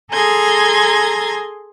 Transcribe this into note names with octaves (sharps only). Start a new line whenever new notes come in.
G#4 A4 A#5 C6 G#6 A#6